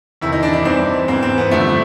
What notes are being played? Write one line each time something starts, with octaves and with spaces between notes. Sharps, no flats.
E2 C3 D#3 E4
D#4
D4
D#4
G2 E3 C4
G#2 E3 C4
C4
B3
G2 D3 F3 A3